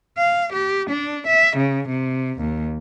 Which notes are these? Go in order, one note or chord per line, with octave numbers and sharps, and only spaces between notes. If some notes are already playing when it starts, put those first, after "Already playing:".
F5
G4
D4
E5
C#3
C3
D#2